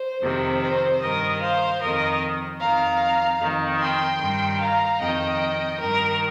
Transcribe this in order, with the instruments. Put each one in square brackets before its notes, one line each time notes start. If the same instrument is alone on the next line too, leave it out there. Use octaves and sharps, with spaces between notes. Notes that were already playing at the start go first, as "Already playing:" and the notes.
Already playing: [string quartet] C5
F2 C3 D#3
C5
G2 D#3 A#4 D#5
C5 F5
F2 D#3 A#4 D#5
F2 D#3 F5 A#5
F2 D#3
G5 C6
G2 D#3
F5 A#5
F2 D#3 D#5 G5
G2 D#3 A#4